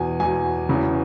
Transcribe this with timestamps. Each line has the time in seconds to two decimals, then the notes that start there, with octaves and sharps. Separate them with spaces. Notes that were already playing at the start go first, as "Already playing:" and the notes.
Already playing: E2 B2 G#5
0.20 E2 B2 G#5
0.69 E2 C#3 E3